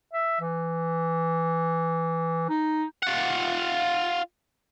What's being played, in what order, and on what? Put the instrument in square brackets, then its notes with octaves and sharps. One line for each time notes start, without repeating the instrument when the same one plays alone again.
[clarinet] E5
E3
D#4
[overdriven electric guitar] F4 F#5